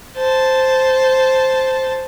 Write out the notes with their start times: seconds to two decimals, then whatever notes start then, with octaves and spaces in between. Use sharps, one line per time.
0.16 C5 A5